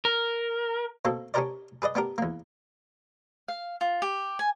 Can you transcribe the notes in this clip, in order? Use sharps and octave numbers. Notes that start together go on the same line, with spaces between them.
A#4
B2 A#3 C4 A4
C#4 D4 G4 A#4 C5 D5
G#4 B4 D5 D#5
B3 D4 G4 A#4
E2 A#3
F5
F4
G4
G#5